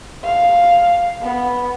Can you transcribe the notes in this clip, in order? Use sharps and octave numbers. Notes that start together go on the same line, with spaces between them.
F5
B3